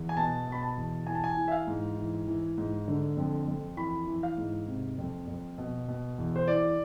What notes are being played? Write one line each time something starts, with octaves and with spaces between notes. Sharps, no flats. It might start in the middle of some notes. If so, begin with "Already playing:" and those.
Already playing: E2
G#5
B2 A5
B2 B5
A5
E2
E3 G#5
A5
G#5
E3
E5
F5
G#2
E3
E3
G#2
D3
F2
F2
E3 B5
E3
F5
G#2
C3
F2
F2
B2
B2
E2
C5
E3 D5